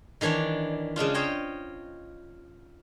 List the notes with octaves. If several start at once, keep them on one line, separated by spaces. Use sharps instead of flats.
D#3 E3 D4 C#5 D5
C#3 G#3 D4 F4
C5 C#5 D#5 G5